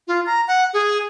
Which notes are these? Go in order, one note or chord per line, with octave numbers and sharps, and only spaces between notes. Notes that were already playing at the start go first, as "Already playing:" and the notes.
F4
A#5
F#5
G#4